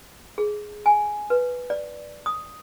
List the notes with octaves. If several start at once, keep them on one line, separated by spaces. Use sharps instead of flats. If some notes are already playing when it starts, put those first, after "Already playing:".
G#4
G#5
B4
D5
D#6